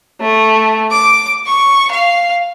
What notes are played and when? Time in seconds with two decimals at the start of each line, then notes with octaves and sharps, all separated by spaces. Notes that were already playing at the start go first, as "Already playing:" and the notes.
0.21 A3
0.91 D6
1.46 C#6
1.91 F5